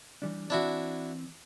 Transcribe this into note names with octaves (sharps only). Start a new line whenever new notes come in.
E3 G3 D4
E3 C4 D4 E4 F#4